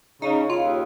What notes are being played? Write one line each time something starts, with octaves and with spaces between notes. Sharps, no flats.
C#3 D#4
C#3
F4
D#2